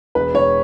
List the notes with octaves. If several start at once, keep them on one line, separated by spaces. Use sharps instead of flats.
E1 B4
E1 C#5